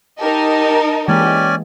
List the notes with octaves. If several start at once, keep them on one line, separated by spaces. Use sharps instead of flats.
D#4 G4 A#4 D#5 A5
E3 G#3 A#3 C#4 G4 D5 G#5